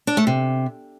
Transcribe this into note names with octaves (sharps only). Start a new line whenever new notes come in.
D4
A3
C3